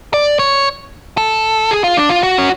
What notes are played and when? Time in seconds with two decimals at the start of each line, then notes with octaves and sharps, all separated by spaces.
0.14 D5
0.39 C#5
1.17 A4
1.71 G#4
1.84 F4
1.97 D4
2.09 F4
2.23 F#4
2.38 C#4